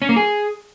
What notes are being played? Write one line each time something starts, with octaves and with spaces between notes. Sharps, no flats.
C#4
A#3
G#4